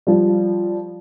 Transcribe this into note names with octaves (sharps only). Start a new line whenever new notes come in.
F3 G3